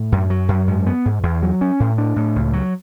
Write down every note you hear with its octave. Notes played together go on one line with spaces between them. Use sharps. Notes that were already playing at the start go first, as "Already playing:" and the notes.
Already playing: A2
F#2
F#3
F#2
G#2
B3
G#2
E2
F#3
C#4
A2
D4
A2
C#2
F#3